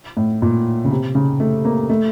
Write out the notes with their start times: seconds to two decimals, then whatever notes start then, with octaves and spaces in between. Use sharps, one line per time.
0.17 A2
0.42 A#2
0.84 C#3
0.91 C3
1.15 C#3
1.40 A3
1.65 A#3
1.89 A3